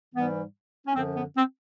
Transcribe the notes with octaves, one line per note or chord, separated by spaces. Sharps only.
G#2 E3 G3 B3
C#4
F#2 D3 F3 C4
B3
C4